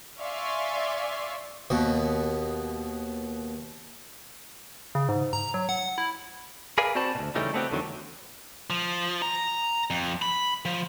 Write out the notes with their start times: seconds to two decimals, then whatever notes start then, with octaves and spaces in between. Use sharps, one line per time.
0.20 D5 E5 F5 G#5 C6 C#6
1.70 D#2 B2
4.95 C#3
5.09 G#2
5.33 A#5
5.54 F#3
5.69 F#5
5.98 E4
6.78 G#4 A#4 B4 D5 F5 G#5
6.95 C4 F#4 C5 D5 A5 B5
7.15 D2 B2
7.35 C#3 E3 G3 A3 C#4 D#4
7.54 A3 B3 C4 F#4 G4
7.71 E2 D3 D#3 F#3
8.70 F3
9.22 A#5
9.90 F2
10.22 B5
10.65 F3